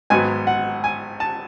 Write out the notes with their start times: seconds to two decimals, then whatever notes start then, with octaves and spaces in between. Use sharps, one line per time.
0.10 G#1 G#2 F#3 B3 G#5
0.47 F#5
0.84 G#5
1.20 A5